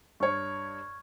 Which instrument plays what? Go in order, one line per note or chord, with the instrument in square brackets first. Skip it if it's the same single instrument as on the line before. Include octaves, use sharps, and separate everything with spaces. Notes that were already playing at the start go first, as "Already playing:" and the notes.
[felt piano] G2 C#5 [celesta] C#6 F6 G#6